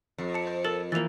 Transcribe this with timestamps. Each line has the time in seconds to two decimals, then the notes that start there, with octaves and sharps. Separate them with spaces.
0.18 F2
0.34 A5 C#7
0.47 C5
0.65 A4 A#4 A6 F#7
0.92 E3 F3 A#3 A6 F7